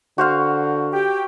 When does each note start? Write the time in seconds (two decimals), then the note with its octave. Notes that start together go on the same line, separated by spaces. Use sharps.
0.18 D3 F#4 C5 F5
0.93 G4 G5